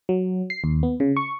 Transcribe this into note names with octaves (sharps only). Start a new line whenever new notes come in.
F#3
C7
D#2
B3
C#3
C#6